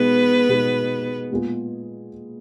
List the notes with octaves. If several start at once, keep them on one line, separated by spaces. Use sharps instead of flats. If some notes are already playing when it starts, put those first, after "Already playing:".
Already playing: B2 G#3 B3 D#4 B4
B2 G#3 D#4
A#2 G#3 B3 F4 G#4